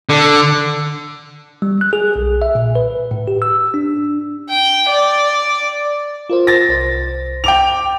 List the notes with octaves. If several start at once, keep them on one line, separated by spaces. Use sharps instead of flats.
D3
G3
F#6
G#4
B1
E5
A#2
B4
A2
G4
E6
D4
G5
D5
F4 A#4 C5
A6 A#6
C2 C5
G5 D6 F7